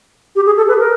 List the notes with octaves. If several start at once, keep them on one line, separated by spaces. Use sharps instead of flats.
G4
G#4
A4
B4
A#4